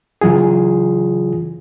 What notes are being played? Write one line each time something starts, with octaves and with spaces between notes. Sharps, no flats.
C#3 E3 F#3 F4 G#4